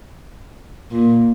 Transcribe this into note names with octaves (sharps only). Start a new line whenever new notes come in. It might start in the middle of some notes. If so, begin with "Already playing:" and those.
A#2